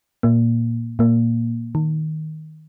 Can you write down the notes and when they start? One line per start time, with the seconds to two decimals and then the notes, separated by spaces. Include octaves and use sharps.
0.23 A#2 A#3
0.99 A#2 A#3
1.75 D#3